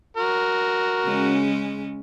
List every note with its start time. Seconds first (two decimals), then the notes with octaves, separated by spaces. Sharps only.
0.17 F#4 A#4
1.05 C#3 G#3 C#4